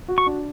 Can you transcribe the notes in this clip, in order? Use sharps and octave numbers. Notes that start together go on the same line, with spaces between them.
F#4
C#6
D4